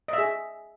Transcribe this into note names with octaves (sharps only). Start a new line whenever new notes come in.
G#4 D#5 E5